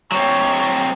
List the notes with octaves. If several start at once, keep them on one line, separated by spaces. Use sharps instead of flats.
F#3 C4 C#5